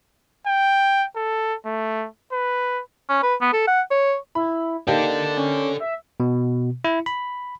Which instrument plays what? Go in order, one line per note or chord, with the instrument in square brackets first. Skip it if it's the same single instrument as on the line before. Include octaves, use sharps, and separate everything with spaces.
[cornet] G5
A4
A3
B4
[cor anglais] C#4
B4
B3
A4
F#5
C#5
[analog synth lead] E4 [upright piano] B5
[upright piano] A#3 D#4 G4 [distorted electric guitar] A4 D5 [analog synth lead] A5
[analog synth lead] C#4
E5
[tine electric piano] B2
E4
B5